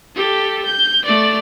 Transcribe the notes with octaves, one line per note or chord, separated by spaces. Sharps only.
G4 A4
G6
A3 D5